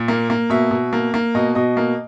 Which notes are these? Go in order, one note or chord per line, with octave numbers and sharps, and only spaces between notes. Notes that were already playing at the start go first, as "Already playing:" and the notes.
Already playing: A#2
A#3
A#3
B2 E5
B2
A#3
A#3
B2 D#5
B2 D#5
A#3